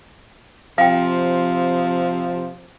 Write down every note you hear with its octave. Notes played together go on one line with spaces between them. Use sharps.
C3 F3 C4 F5 G5